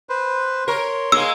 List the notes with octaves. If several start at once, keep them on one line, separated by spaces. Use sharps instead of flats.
B4 C5
A#4 C#5 C6
G#3 A#3 E6